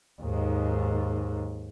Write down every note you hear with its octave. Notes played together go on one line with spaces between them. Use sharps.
D#2 G#2